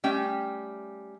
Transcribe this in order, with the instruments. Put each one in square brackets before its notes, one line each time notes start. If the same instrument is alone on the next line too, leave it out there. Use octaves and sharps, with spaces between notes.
[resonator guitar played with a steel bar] G3 A3 C#4 G5